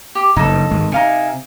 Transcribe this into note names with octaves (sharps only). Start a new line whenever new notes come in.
G4
F#1 G2 D#4 A4
G#1 G#3
C3 D#4 F5 G#5